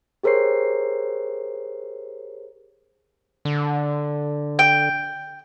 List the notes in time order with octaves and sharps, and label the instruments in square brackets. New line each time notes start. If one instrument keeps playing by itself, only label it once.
[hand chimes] G4 G#4 A#4 C5 C#5 C7
[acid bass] D3
[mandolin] G5